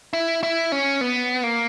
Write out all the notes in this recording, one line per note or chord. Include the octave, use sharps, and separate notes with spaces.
E4
E4
C#4
B3
A#3